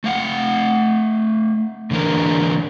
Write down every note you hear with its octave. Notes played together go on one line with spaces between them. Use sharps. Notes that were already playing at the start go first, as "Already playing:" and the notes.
A3 F5 F#5
G#2 D3 E3 A#3 D4 A#4